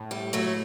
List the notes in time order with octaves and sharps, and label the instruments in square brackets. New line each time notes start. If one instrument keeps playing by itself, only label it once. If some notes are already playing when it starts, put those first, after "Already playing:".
Already playing: [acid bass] A2
[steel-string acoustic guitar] G3
F#3 A3